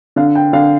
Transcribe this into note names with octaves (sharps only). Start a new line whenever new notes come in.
D3 F5
G5
D3 F5